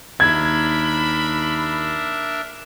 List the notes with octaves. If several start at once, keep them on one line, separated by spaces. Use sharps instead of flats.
D#2 D4 A#4 E5 B5 G#6